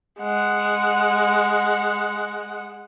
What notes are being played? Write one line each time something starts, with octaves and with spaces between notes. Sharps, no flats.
G#3 F#5